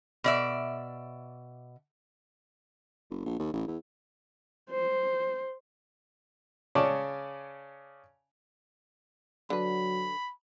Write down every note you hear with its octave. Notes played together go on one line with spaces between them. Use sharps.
B2 D5 E5
F#1
A#1
D#2
A1
E2
C5
C#3 C#4 C#5 D5 A5
D3 F#3 B4 B5